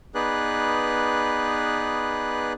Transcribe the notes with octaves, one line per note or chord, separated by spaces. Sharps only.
B3 D#4 G#4 B4 D5 F#6